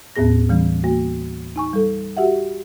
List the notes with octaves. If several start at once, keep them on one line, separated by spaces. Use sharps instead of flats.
D#2 A2 B3 G#4 A#6
E3 G3 C#4
A#3 F#4
D#4 G#5 C#6
G3 A4
F#4 G4 E5 F#5